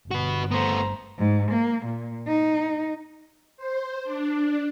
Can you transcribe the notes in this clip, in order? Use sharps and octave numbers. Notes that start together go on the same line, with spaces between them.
G1 F#4 B4
A3 B3 C5 A#5
G#2
A#3
A#2
D#4
C5
D4